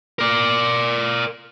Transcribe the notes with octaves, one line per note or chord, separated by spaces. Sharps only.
A#4 D5